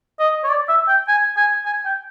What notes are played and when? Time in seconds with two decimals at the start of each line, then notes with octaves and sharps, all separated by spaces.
0.19 D#5
0.44 C#5
0.49 D5
0.69 E5
0.88 G5
1.08 G#5
1.37 G#5
1.66 G#5
1.85 G5